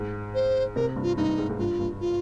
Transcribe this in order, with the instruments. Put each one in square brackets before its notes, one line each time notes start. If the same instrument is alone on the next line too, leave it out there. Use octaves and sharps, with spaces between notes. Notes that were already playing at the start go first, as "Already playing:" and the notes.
Already playing: [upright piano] G#2
[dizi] C5
[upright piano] C3 [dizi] A#4
[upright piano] G2
[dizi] F4
[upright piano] G2 [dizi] D#4
[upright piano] G2
G#2
G#2
[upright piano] G2 [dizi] F4
[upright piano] G2
[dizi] F4